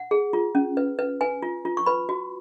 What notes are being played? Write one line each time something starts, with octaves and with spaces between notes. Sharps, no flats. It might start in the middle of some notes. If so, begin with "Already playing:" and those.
Already playing: F#5
G#4
F4
C#4
B4
B4
B4 G#5
F4
F4
C#6
B4 B5
F#4